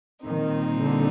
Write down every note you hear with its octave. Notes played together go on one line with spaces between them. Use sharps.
A#2 D#3 G3 C4 D#4
D3